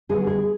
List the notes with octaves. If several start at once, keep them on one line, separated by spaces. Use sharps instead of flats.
D3 G3 B3 G#4
G#4